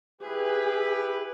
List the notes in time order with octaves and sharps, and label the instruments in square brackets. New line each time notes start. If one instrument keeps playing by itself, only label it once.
[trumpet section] E4 G4 B4 [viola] G#4